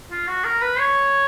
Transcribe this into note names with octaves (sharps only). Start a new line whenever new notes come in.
F4
F#4
A#4
B4
C#5